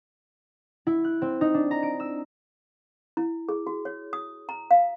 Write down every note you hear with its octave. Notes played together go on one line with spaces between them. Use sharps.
E4
F#6
C4
D#4
D4
A#5
D7
E6
E4
G#4
F#4
C#5
D#6
A#5
F5